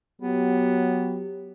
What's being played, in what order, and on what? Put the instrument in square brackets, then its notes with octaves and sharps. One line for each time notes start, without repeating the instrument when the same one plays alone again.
[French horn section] F#3 G4 [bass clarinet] B3